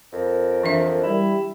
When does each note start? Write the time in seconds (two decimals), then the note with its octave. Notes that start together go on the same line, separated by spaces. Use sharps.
0.13 F2 A#4
0.63 E3 D4 E5
1.03 G3 E4